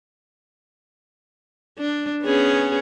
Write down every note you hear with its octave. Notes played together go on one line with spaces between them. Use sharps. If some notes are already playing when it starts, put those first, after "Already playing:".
D4
B3 C#4 G#4